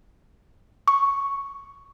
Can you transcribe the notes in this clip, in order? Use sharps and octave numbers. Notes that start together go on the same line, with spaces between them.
C#6